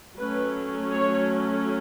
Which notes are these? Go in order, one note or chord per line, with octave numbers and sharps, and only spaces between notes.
F#3 A3 C#4 B4
C#5